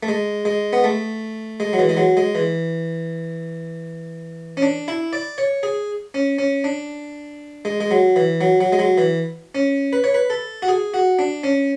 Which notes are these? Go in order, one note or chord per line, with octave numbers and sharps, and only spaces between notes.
A3
G#3
G#3
B3
A3
G#3
F#3
E3
G#3
F#3
G#3
E3
C#4
D4
E4
D5
C#5
G#4
C#4
C#4
D4
G#3
G#3
F#3
E3
F#3
F#3
G#3
F#3
E3
C#4
B4
C#5
B4
A4
F#4
G#4
F#4
D4
C#4